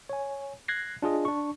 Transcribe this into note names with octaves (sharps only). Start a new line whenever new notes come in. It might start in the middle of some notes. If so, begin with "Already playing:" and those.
C#5 G#5
F#6 G#6 A#6 C7
D4 F4 G#4 D#5
D4 C#6